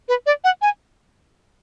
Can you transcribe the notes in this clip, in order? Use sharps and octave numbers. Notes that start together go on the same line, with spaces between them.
B4
D5
F#5
G#5